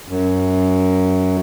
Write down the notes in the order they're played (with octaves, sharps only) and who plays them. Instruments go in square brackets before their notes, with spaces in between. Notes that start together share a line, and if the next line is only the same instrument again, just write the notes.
[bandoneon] F#2